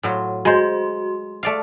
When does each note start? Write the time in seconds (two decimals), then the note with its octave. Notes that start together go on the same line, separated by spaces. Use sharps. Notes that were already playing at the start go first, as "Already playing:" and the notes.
0.03 A2 F#3 F4
0.45 G#3 F#4 C5 C6
1.43 A3 D5 F5